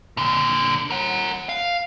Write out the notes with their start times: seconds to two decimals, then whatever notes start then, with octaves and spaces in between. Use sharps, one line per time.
0.17 A#2 D3
0.90 A#4 F#5
1.49 F5